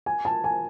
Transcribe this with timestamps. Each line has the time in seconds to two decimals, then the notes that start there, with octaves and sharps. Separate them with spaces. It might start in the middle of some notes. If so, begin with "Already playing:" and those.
0.06 G#5
0.25 A5
0.44 G#5